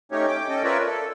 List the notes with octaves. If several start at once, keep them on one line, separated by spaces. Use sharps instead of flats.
A3 C#4 D#4 G4 C#5
G5 D6
C#4 A4 D#5 G5
F4 A#4 B4 C#5 D5 E5
A4